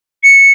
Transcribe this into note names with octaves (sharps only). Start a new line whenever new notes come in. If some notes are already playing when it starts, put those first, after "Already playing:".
C#7